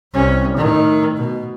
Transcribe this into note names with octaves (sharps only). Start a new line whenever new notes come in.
C2 C#4
A2 D#3
B2